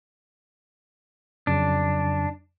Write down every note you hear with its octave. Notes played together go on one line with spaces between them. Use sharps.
F2 C#3 F#3 D4